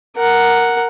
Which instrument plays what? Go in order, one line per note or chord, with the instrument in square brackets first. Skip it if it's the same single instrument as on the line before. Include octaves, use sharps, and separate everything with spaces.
[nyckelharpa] A#4 F#5